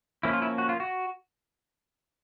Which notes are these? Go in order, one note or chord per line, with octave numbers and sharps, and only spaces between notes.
F3 A#3 C#4 E4
F4
E4
F#4
F4
F#4